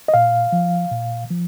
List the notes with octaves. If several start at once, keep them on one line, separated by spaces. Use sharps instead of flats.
D#5
A#2 F5
F3
A#2
F3